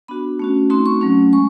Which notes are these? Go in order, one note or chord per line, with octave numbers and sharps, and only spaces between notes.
B3 D4 F#4 B5
A3 C#4 F#4
A3 C4 D#4 F#4 C6
C#6
F#3 A3 C#4
G#3 C#6